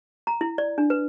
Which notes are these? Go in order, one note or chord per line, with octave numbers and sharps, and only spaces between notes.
A#5
E4
D5
D4
B4